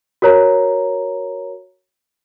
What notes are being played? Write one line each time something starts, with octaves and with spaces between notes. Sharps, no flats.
F#4 A#4 C#5 A#5